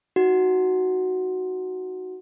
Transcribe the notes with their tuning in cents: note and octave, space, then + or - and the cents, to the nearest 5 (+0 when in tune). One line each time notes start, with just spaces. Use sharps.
D#4 +10 F#4 +0